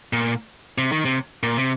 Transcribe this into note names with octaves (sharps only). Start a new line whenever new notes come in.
A#2
C3
D#3
C3
A#2
C3